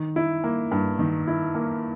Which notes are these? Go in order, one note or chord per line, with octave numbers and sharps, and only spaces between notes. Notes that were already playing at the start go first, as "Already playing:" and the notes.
Already playing: D#3
E4
A#3
G2
D#3
E4
A#3